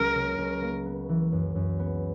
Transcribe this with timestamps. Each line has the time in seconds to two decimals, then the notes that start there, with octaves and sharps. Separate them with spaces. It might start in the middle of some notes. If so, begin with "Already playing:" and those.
Already playing: C#2 F#3 A#3 A#4
0.15 C#3
0.38 C#2
0.61 A#3
0.86 B3
1.09 E3
1.32 F#2
1.55 F#2
1.79 B3